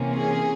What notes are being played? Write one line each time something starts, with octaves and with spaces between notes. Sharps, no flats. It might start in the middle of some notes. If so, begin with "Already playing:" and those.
Already playing: C3 E3 A#3 C#4
G#4